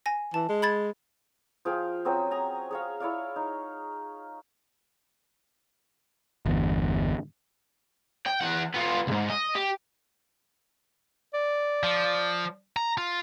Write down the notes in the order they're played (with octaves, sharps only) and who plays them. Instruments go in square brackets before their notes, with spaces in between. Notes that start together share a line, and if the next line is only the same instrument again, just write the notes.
[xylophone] G#5 A#6
[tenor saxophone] E3 [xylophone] A5
[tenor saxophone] G#3
[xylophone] B5 G#6 A6
[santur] F3 G#4 F5 G5
F#3 C4 C#4 G#4
G#5 A#5 D#6
G#4 C#5 F5
E4 C#5 D5 F5
D#4
[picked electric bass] G1 E2
[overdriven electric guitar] G5
E3 F#5
B3 F4
C2 G#2
D#5
G4
[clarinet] D5
[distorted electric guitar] F3
A#5
F4